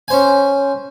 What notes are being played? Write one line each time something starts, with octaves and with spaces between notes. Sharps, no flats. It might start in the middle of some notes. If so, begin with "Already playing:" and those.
C#4 C5 G#5